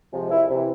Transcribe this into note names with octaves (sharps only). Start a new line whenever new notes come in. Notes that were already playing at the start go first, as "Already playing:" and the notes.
C3 F3 G#3
C2 E4
C3 E3